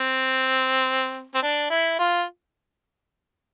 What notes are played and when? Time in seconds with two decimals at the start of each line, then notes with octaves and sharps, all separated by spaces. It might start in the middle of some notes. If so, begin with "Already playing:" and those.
Already playing: C4
1.35 C4
1.43 D4
1.71 E4
1.99 F4